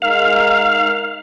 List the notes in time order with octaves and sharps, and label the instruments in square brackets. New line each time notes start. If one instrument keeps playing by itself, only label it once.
[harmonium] G#3 D#4 A#4 [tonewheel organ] F5